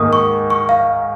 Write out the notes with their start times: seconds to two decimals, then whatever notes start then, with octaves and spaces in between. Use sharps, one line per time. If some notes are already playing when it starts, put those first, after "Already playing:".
Already playing: G#2 D#3 A#3 C#6 D#6
0.13 C#6
0.50 C#6
0.69 F5